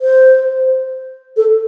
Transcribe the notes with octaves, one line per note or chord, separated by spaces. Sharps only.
C5
A4